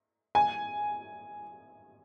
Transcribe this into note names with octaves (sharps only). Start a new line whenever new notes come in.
G#5